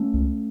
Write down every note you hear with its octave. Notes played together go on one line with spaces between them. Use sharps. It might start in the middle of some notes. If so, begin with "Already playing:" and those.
Already playing: A3 C#4
C#2